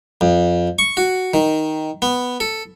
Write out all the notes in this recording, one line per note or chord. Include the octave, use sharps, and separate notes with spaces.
F2
C#6
F#4
D#3
B3
A4